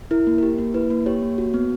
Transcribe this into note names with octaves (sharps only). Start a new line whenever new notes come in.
E4 A#4
A#3
G4 A#4
A#3
E4 B4
A#3
G4 C#5
A#3
F#4
B3